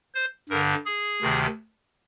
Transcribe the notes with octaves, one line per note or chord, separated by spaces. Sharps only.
C5
G2 D3 A#4
G#4
D2 C3 D#3